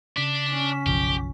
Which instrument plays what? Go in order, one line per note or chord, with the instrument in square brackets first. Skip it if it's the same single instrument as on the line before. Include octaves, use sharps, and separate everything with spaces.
[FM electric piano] C#3 B6 [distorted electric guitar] D4
[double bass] C#4
[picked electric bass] F#1 B1 F3 [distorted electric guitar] G4